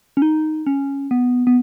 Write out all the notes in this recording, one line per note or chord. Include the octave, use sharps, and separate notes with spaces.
C#4
D#4
C#4
B3
B3